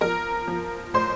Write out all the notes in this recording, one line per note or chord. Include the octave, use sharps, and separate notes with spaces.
F3 A#4 A#5
F3
A2 C5 C6